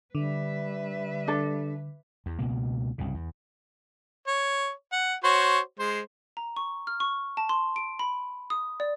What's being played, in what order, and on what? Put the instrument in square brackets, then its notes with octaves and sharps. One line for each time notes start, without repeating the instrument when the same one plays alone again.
[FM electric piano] D3 [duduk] G3 [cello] B4 E5
[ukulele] D4 A4
[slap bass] E2
C#2 B2 A#3
C2 G2 C#3
E2
[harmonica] C#5
F#5
F#4 C5 C#5
G#3 C5
[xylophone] A#5
C#6
F6
C#6
A5
C6
D7
B5
D#6
D5